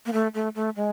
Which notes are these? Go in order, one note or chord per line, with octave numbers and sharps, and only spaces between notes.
A#3
A3
A3
A3
G#3